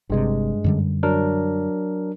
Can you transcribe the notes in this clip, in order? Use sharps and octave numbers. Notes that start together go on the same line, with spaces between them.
G1 G2 C3 G#3
F#2 D3 G3
F#3 D4 A#4